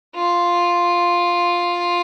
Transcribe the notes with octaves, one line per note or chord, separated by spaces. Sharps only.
F4